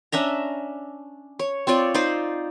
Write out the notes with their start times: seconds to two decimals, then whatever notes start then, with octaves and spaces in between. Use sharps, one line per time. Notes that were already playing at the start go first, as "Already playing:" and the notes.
0.12 C#4 D4 E5 A#5
1.39 C#5
1.67 C4 F4 C#5 D5
1.94 D#4 C5 D5